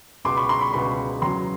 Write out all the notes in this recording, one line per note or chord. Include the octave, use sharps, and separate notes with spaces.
C#2 B2 G#3 C6 D6
B5 C#6
A#5 C6
B5 C#6
C#2 B2 G#3 B5 C#6
E2 C#3 F#3 A#5 C6